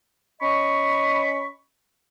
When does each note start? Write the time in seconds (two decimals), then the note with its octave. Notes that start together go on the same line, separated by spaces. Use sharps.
0.42 C#4 D#5 B5 C#6